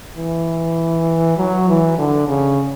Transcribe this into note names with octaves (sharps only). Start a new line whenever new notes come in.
E3
F#3
E3
D3
C#3